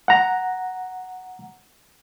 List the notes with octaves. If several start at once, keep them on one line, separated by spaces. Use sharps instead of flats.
F#5 A#5